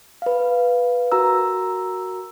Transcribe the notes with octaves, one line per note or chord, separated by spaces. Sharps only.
B4 F5
F#4 A#4 A#5 E6